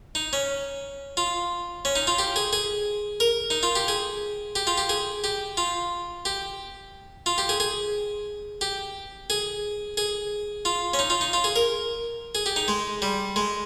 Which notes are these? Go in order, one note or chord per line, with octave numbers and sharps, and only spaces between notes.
D#4
C#4
F4
C#4
D#4
F4
G4
G#4
G#4
A#4
D#4
F4
G4
G#4
G4
F4
G4
G#4
G4
F4
G4
F4
G4
G#4
G#4
G4
G#4
G#4
F4
C#4
D#4
F4
D#4
F4
G#4
A#4
G#4
G4
D#4
G#3
G3
G#3